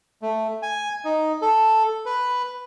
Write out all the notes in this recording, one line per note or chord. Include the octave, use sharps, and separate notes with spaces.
A3
G#5
D#4
A4
B4